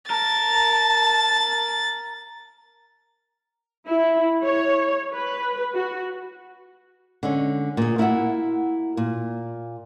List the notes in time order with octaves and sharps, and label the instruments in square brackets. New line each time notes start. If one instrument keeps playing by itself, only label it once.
[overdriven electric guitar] A#4 [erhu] A5 [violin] A6
[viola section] E4
C#5
B4
F#4
[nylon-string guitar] D3 G#3 C#4
A#2 G#4
A#3 E4 F#4 E5 F#5
A#2